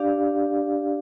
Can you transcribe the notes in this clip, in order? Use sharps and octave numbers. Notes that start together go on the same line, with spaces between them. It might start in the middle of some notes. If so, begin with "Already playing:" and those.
Already playing: D4 G4 D5 F5